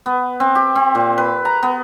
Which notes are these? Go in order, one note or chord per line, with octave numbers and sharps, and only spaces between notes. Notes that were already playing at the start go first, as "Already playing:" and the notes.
B3
C4
G4
C4
A#2
B4
A#5
B3